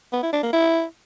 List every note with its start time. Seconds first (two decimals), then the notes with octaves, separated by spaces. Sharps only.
0.13 B3
0.23 E4
0.33 D4
0.43 A#3
0.53 E4